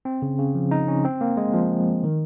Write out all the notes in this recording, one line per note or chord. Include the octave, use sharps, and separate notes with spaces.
C4
C#3
C#3
F3
D#4
C#4
C4
A#3
G#3
F3
D#3